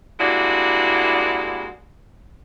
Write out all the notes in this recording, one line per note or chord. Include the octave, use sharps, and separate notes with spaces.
G3 G#3 A#3 D4 E4 F#4